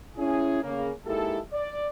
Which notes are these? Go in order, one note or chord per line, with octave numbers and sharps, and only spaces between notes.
C#4 E4 G#4
C#3 A#3
G#3 A#3 D#4 E4 G4 A4
D5